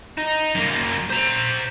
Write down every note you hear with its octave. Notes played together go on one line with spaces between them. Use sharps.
D#4
F#2 A#3
C5 A#5